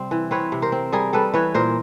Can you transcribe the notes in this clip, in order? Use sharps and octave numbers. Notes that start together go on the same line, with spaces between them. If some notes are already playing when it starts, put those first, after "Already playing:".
Already playing: C3 G3 C4
E3
C4 B4 C#5
C3
A#4 C5
C4
G3 G#4 A#4
G3 A4 B4
E3 B4 C#5
A#2 A#4 C5